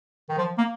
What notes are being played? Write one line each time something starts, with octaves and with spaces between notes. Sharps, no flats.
D#3
F3
A#3